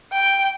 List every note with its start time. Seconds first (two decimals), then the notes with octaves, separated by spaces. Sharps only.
0.13 G5